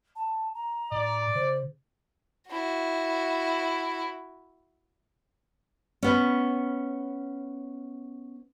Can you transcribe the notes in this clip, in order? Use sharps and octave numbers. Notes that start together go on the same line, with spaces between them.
A5
A#5
A2 D5
C#3 C5
E4 F#4
B3 C#4